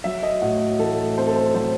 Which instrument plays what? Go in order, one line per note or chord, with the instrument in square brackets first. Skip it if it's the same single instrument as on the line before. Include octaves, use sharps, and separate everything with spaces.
[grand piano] F#3 E5
D#5
A2 F#4
A1 A4
C4 C5
A4
C5
F#3 C5